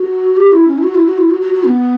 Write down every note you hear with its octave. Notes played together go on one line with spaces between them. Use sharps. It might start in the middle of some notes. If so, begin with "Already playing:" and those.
Already playing: F#4
G4
E4
C#4
E4
F#4
E4
F#4
E4
F#4
F#4
F#4
B3